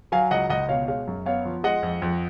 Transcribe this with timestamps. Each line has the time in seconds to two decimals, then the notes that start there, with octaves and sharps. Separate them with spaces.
0.12 F#3 F5 G#5
0.31 C#2 D#5 F#5
0.50 C#2 D#5 F#5
0.69 B2 C#5 F5
0.88 G#3 C#5 F5
1.07 F#2
1.26 B3 C#5 F5
1.45 F3
1.63 G#3 D#5 F#5
1.83 F2
2.02 F2